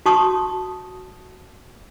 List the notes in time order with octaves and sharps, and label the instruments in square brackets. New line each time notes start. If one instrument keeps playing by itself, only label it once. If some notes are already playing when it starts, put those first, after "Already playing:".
[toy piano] F#4 A5 C#6 D#6